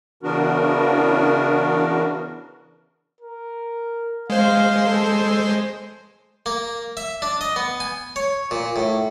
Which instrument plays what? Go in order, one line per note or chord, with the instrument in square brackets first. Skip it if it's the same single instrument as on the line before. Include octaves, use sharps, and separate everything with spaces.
[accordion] C#3 E3 B3 D4 F#4 A#4
[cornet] A#4
[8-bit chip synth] G#3 C5 [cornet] F5
[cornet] A4
[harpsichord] A#3
E5
D4
D#5
B3
G#5
C#5
A#2
A2